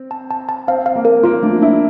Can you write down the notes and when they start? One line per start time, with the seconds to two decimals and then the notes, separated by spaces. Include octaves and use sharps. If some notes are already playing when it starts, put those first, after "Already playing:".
Already playing: C4
0.11 A5
0.31 A5
0.49 A5
0.68 C4 F5
0.86 F5
0.96 A#3
1.05 A#4
1.24 A#3 F4
1.43 A3 D4
1.62 D4 E4